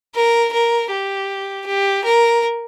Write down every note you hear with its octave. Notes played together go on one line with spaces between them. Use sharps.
A#4
A#4
G4
G4
A#4